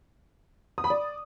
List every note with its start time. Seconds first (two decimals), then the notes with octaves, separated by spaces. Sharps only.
0.78 D#6
0.84 B5
0.90 D5